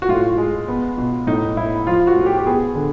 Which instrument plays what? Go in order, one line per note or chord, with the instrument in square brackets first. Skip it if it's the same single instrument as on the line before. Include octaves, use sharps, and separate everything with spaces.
[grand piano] F#4
A2 F4
G#3
B3
B2
A2 D#4
A2 E4
F3 F4
F#4
A2
G4
G4
B3 G#4
D3